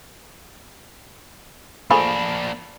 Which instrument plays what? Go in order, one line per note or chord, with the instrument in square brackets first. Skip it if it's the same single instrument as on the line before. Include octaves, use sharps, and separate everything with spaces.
[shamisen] F3 A3 G#4 [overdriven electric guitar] A#3 D4 [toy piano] B5